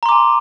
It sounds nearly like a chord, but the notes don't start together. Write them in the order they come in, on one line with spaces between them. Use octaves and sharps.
A#5 C6 D6 G#5